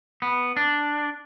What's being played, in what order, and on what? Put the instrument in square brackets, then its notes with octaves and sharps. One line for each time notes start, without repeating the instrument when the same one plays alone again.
[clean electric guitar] B3
D4